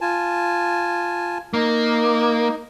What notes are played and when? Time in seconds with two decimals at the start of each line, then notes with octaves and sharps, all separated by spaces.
0.01 F4 G#5 A5
1.54 A#3 D#4